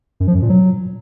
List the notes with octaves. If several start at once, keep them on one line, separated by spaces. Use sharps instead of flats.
F#2
F3
F#2
A#2
F#3